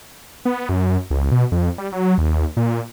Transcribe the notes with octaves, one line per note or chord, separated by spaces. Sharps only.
B3
F#2
C#2
B2
F2
G3
F#3
D#2
A#2